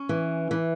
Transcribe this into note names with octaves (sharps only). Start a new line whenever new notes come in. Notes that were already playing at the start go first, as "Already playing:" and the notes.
Already playing: C#4
E3
E3